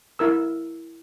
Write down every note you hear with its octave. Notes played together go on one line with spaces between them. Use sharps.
E4 A#4 E6